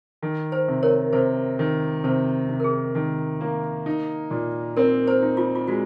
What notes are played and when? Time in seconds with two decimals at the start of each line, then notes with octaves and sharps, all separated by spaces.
0.23 D#3
0.52 C5
0.68 C3
0.83 A#4 C#5
1.13 C3 C5
1.59 D#3
2.04 C3 C5
2.49 C3
2.60 A#4
2.64 G#4
2.95 D#3
3.41 A#3
3.86 D#4
4.31 A#2
4.77 C4 A#4
5.08 C5
5.22 D#4
5.37 F4
5.56 F4
5.68 G#3 F#4